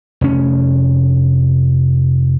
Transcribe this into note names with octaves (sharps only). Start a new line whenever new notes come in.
F1 C#4